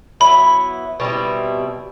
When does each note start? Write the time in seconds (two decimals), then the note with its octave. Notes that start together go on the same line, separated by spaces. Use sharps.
0.20 F#3 B3 E4 B5
1.00 B2 G3 C4 E4